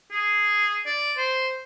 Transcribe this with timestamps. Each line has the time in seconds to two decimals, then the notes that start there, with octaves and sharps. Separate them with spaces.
0.11 G#4
0.86 D5
1.17 C5